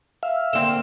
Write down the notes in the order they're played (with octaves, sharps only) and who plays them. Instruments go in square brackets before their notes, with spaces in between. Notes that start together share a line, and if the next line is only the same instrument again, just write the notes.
[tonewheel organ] E5 F5
[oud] D3 A#3 C4 [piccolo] E7